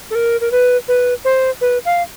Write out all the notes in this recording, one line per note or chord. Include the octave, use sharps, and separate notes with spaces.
A4
A#4
A#4
B4
B4
C5
B4
F5